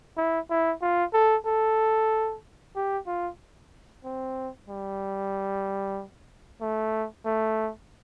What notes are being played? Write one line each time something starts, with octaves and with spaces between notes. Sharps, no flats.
E4
E4
F4
A4
A4
G4
F4
C4
G3
A3
A3